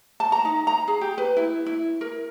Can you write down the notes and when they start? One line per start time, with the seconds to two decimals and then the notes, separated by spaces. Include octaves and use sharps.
0.20 A5
0.32 A#5
0.45 D#4
0.67 A#5
0.88 G#4
1.01 G4
1.18 B4
1.37 E4
1.66 E4
2.01 A#4